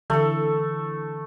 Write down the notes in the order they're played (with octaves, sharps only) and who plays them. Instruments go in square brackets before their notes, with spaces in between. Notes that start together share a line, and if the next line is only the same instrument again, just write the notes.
[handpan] D3 E3 [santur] A3 A4